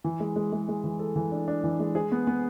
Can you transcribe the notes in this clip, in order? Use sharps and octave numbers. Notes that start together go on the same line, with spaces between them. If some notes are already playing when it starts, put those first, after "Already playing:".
E3
G#3
G#3
G#3
G#3
E3
A4
E3
D4
D4
E3
G#3
G#4
B3
B3